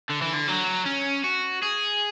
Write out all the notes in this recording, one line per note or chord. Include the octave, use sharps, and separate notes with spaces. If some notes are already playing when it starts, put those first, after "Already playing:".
D3
E3
D3
F#3
C#4
F#4
G#4